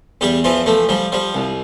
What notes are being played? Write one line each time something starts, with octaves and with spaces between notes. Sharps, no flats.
E2 G3 G4
E3 F3 F4
F3 A3
F3 G3
F3 G3
C2